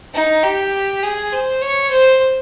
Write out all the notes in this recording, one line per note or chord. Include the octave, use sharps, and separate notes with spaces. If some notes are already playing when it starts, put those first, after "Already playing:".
D#4
G4
G#4
C5
C#5
C5